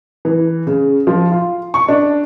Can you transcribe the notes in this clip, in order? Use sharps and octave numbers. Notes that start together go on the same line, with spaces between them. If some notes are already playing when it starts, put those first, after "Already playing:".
E3
C#3
F3
F4
C#6
D4